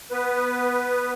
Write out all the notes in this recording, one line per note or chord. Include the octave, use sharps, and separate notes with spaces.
B3 B4